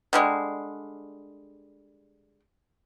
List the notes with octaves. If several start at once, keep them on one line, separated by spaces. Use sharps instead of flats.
D3 G3 G#3